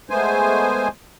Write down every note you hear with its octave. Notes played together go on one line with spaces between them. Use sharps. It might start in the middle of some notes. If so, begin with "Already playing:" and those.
G#3 A3 B3 C5 G#5